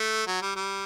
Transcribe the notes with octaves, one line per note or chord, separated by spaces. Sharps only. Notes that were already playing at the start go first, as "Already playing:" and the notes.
Already playing: A3
F#3
G3
G3